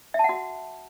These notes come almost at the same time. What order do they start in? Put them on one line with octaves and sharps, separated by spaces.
E5 A5 F#5 F#4